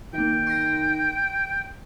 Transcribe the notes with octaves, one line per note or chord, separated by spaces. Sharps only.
D#3 A#3 D#4 G5
C6 A#6